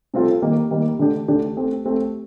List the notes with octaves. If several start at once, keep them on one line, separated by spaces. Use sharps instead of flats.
C3 G3 C4 F4 A4
D#3 G3 A#3
D#3 G3 A#3
D3 A3 D4 G4
D3 A3 D4 G4
A3 C4 G4
A3 C4 G4